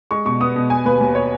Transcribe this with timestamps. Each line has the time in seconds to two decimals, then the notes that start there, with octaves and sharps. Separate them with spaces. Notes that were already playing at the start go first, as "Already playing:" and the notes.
0.11 G#3 C#6
0.25 B2 C#6
0.40 B3 D#6
0.56 B2
0.70 B3 G#5
0.85 D#2 B4
1.01 D#2
1.15 C#5